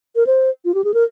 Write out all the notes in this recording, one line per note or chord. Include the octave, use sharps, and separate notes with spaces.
A#4
C5
F4
G4
G#4
A#4